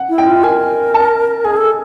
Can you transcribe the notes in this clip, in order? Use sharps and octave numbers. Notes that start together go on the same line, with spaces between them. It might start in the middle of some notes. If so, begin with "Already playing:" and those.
Already playing: F#5
E4
G5
F4
A#4 G#5
A5
G#4 G#5
A4